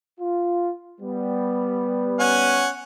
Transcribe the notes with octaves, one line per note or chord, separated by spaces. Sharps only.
F4
G3 B3
C#4 F#5 G#5